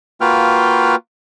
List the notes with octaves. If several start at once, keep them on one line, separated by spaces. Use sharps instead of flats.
A#3 F4 F#4 B4 G5 F6